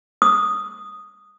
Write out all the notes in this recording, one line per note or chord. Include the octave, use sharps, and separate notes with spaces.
D#6